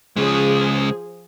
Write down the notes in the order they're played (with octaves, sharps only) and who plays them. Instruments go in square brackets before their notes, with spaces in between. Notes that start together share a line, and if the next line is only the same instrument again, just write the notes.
[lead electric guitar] C#3 G#3 [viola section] F3 G#4